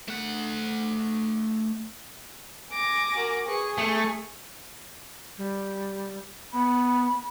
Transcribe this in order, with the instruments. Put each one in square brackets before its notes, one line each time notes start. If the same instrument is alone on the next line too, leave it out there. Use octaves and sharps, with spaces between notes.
[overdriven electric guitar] A3 F#5
[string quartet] G#5 D6 A#6
[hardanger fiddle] F#4 A#4
[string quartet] G#4 [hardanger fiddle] B4 C#6
[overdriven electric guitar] A3 [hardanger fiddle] G#5 C#6
[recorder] G3
[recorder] B3 [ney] B5